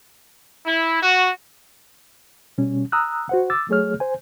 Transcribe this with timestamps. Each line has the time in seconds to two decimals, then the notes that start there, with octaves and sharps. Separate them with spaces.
0.65 E4
1.02 F#4
2.58 B2 G3 C#4
2.92 A#5 D#6 E6 F#6
3.29 F#4 C5 F#5
3.50 D6 E6 A6
3.69 F#3 A3 G#4 C#5 F6
4.00 C5 G#5